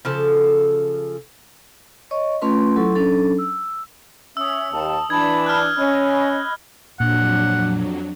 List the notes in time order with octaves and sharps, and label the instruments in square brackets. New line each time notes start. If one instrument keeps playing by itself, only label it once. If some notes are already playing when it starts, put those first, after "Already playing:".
[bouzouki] C#3 F3 A4
[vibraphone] C#5 D#5 C#6
A3 C#4 F4 B4 C6
F#3 E4 A4 C6 C#6
F#3 C#4 D4 A4
E6
[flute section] C#4 E5 [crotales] D#6 E6
[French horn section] D#2 [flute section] A5
[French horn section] E3 D4 [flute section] A5 B5 [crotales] G#6
[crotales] F6 F#6
[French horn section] C#4 [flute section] D#5 B5
[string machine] F2 F#3 [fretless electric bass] A#2 [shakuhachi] D4 [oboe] F#5